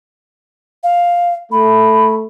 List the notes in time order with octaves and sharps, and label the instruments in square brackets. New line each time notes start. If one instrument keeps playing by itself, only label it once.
[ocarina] F5
[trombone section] A3 [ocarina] B5